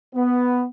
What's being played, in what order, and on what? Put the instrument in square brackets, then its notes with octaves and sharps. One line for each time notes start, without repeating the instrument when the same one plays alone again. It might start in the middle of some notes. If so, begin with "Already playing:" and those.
[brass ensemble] B3